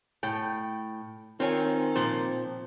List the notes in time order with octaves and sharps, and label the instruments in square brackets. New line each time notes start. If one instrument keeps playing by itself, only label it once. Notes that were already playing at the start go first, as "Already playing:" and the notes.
[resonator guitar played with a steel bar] A2 G5
[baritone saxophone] D#3 [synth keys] C4 [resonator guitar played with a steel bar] F4 C#5 G#5
[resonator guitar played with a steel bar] A#2 F3 C5